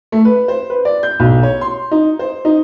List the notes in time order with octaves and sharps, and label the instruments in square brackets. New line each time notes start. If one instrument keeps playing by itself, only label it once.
[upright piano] A3
B4
C5
B4
D5
G6
B1
C#5
C6
D#4
C5
D#4